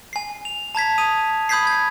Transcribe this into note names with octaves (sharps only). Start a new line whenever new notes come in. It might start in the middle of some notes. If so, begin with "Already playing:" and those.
G#5 C7
F7
A5 A#5 G#6 B6
D#6 D#7 F7
B5 D#6 G6 G#6 B6 C7
G#6